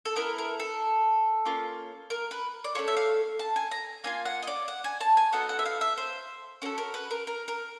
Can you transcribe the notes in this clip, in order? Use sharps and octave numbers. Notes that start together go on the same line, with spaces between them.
A4
B3 E4 A4 A#4
A#4
A4
A#3 C#4 F4
A#4
B4
D5
A3 C#4 F4 A4 C#5
E5
F5
A5
G#5
A#5
A#3 D4 F4 G#5
F#5
D#5
D5
F#5
G#5
A5
G#5
B3 D#4 F#4 A4 F#5
F#5
E5
F5
E5
C5
C#4 F#4 A4 A#4
A#4
B4
A#4
A#4
A#4